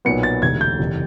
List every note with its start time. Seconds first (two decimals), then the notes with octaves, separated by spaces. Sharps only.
0.05 B1 A#2 F#3 B3 C#7
0.23 A6
0.42 E1 D2 C3 G#6
0.61 G6
0.79 F#1 E2 C3